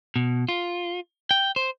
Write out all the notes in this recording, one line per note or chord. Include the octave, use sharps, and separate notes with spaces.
B2
F4
G5
C5